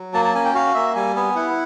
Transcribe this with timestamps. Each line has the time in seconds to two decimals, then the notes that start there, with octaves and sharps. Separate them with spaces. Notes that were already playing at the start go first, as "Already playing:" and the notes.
Already playing: F#3
0.14 A#3 A5
0.25 A5
0.34 C#4 G#5
0.45 G5
0.55 F#4 F5
0.74 A#3 E5
0.95 G3 G#5
1.16 B3 G#5
1.35 E4 F#5